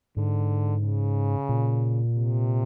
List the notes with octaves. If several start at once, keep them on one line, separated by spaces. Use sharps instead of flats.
G#2 D3
C#3
A#2
C3